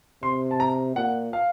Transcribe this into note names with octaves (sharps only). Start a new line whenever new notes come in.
C3 C6
A5
A#5
A#2 F#5
F5